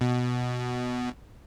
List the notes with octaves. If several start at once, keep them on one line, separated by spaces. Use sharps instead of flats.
B2